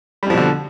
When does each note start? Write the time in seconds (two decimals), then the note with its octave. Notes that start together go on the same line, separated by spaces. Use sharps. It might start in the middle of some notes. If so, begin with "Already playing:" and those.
0.23 G3
0.26 F2
0.30 F3
0.34 B2
0.37 D3